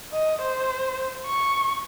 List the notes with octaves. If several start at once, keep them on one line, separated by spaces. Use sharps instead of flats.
D#5
C5
C#6